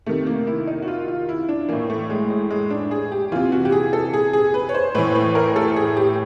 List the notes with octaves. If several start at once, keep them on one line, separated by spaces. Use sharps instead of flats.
C3 D#3 A3
A#3
E4
D#4
F#4
F4
F4
E4
D4
A2 E3 A#3
A3
G#3
G#3
G#3
D4
G#4
G4
C3 E3 F4
F#4
G4
G#4
A4
G#4
G#4
B4
C#5
C5
A2 E3 B4
B4
A#4
A4
G#4
G4